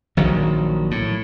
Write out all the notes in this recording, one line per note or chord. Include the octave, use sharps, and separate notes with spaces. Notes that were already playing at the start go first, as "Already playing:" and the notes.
A#1 D#3 F#3
A2